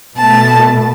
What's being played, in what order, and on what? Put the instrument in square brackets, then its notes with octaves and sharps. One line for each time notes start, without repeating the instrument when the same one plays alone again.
[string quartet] B2 A3 A5